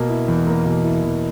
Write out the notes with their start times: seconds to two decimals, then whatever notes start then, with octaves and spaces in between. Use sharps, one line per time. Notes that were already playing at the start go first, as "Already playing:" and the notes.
Already playing: B2 A#3
0.09 E4
0.28 E2
0.47 A#3
0.65 B2
0.84 E4
1.03 E2